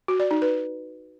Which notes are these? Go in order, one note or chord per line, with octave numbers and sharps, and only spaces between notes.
F#4
D5
D#4
B4